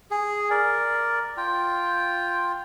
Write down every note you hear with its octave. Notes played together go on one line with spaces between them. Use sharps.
G#4
A#4 D5
F4 G5